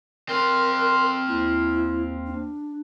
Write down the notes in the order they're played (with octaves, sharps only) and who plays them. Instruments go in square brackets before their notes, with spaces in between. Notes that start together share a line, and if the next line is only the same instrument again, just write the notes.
[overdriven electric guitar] C4 F4 [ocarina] A#4 [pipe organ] C6 F6
[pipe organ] D#2 [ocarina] E4
[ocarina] D4